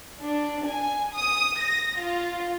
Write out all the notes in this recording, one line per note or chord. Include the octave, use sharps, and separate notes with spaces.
D4
G#5
D#6
A#6
F4